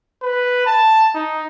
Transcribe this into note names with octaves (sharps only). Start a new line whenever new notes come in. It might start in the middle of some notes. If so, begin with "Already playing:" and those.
B4
A5
D#4